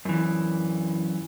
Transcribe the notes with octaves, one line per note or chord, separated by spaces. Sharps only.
F#2 E3